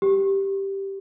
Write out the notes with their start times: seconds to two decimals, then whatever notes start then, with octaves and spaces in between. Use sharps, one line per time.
0.02 G4